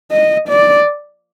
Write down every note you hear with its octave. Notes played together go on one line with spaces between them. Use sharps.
D#5
D5